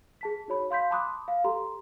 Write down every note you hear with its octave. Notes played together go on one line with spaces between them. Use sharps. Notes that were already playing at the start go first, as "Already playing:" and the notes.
G#4 A5 B6
D#4 F#4 C#5 B5
F5 C6 G6 B6
A5 B5 C6 D6 D#6 F#6
F5
G4 A4 A#5 C6